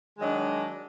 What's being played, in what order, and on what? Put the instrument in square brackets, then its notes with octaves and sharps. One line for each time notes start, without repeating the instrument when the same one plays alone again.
[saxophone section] D#3 F#3 G#3 D4 D#5